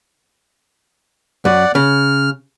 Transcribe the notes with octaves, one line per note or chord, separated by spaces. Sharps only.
F#2 D5 F#5
C#3 F6